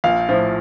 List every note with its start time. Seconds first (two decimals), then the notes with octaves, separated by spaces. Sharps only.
0.04 A#1 F5
0.29 A2 F3